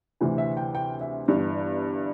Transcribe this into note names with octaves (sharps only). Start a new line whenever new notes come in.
D2 C3 E3
E5
G5
G5
E5
G1 G2 E3